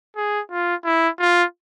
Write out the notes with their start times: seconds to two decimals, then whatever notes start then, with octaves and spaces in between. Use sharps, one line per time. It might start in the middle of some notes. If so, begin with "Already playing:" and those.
0.17 G#4
0.51 F4
0.85 E4
1.20 F4